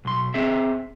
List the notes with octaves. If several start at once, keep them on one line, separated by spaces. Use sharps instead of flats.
B1 C6
C4 G#4 E5